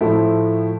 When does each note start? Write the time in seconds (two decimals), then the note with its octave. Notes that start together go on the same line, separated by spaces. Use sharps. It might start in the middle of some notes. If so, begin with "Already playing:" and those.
0.01 A2 F3 A3 E4